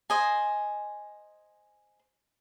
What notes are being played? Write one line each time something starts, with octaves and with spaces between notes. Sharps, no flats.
C5 D#5 G#5